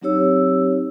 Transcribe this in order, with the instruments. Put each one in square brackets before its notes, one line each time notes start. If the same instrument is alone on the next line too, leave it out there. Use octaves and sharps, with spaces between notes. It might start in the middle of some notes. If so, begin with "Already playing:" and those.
[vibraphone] F#3 C4 D#4 G4 C#5 E6